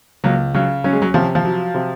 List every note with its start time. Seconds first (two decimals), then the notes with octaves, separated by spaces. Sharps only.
0.24 C#2 F#3 A#3
0.54 C#3 F#3
0.84 F#3 C#4
0.93 G#3
1.02 F#3
1.14 C3 F3
1.35 F3
1.45 F#3
1.74 C3